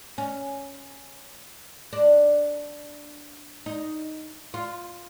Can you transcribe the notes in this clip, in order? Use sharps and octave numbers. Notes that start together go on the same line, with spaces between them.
C#4
D4
D#4
F4